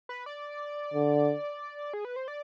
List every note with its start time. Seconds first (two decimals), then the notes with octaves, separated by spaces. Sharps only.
0.09 B4
0.26 D5
0.94 D3
1.93 G#4
2.05 B4
2.16 C5
2.28 D5